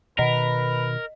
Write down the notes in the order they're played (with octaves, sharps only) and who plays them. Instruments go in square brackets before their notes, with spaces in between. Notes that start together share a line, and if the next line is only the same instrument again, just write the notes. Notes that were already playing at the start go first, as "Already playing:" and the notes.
[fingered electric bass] B2 D#3 [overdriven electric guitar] A#4 [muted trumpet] B4 [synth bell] D#5